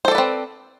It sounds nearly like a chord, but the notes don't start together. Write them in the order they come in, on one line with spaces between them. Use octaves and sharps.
C5 A4 D5 B4 C4